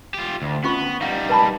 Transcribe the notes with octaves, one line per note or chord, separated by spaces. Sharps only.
F4 G4
D2
B3 C#4 F4 C#6
G3 D#4 F5 F#5
B4 A5 B5